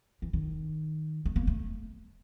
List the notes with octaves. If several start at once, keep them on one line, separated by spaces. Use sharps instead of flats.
E3
D#3
A3
A#3
A3